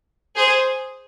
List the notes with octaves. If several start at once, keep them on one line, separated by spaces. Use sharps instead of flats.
G#4 C5